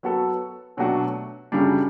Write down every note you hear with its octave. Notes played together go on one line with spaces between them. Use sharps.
F#3 B3 F#4 A4
B2 F#3 A3 D4 F#4
F#2 C#3 G3 D4